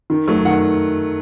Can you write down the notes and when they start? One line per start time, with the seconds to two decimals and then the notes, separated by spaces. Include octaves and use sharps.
0.10 D#3
0.28 F#3 A3
0.45 D#3 F#5